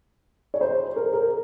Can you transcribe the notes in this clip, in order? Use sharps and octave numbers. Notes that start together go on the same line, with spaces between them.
C#5
C5
A#4
A#4